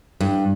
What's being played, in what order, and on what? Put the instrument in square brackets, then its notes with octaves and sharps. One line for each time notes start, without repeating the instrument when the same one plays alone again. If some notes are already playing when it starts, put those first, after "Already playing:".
[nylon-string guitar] G2